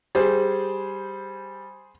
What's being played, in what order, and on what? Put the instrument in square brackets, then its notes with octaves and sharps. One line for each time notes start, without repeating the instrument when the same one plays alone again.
[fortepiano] G3 [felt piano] G#4 C5